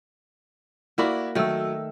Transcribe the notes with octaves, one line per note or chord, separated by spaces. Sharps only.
A#3 E4 F#4 A#4 D5 B5
D#3 F#3 A3 E6